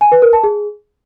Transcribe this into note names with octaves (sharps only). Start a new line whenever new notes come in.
G#5
B4
A#4
A5
G#4